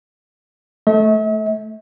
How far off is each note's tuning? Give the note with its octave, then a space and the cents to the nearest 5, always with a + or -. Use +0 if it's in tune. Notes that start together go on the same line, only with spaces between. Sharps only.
A3 -5 E5 -40